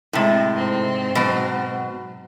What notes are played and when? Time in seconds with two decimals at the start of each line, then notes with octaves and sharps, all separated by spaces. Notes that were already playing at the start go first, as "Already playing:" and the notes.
0.13 A2 C3 G#3
0.54 G#2 C4
1.15 B2 F#3